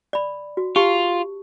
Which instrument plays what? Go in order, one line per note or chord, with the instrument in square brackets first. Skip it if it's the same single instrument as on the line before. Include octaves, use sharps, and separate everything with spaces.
[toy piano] D5 B5
F#4
[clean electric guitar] F4 [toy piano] G4 A5 C#6